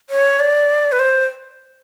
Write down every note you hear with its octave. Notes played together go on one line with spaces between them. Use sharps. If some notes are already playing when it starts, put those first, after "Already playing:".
C#5
D5
B4
C5